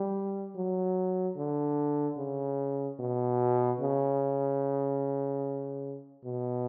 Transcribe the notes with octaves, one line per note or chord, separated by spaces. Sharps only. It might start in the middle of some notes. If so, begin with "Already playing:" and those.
Already playing: G3
F#3
D3
C#3
B2
C#3
B2